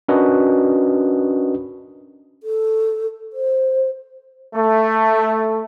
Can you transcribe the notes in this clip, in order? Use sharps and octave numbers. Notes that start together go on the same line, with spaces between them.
C#4 D4 F#4 A#4 B4 D#5
A4
C5
A3